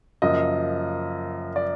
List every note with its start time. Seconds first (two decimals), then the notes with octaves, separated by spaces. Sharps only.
0.22 F#2 C#3 F3 A#3 D#5
1.56 D5